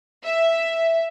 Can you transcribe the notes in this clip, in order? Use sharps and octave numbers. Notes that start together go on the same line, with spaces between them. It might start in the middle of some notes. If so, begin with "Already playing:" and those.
E5